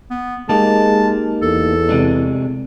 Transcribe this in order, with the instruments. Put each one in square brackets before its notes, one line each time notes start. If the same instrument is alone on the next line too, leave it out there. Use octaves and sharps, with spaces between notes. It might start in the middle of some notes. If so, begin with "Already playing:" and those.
[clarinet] B3
[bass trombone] G#3 [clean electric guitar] A#3 D#4 G4 [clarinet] A5
[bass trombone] E2 [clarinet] A4
[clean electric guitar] C3 G#3 D4